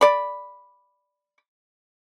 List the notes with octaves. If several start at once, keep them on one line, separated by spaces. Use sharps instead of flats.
D5 B5